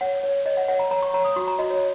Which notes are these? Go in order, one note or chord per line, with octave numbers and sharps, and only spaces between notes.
C#5 F#5
C#5
C#5 D#5
F#5
C#5 F#5
A#5
C#5 A#5
C#6
C#5 A#5
D#6
F#4 C#6
A#5
F#4 D#5
C#5